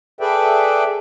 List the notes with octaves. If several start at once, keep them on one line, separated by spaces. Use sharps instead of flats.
G#4 A4 B4 D5 E5 G5